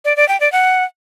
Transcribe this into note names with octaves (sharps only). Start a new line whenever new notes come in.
D5
D5
G5
D5
F#5